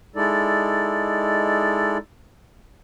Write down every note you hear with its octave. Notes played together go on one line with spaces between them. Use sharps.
G#3 D#4 E4 A4 D5